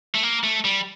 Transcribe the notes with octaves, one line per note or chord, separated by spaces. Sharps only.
A3
A#3
A3
G3